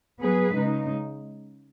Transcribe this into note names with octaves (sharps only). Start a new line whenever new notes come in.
F#3 B3 G#4 B4
C#3 G#3 D#4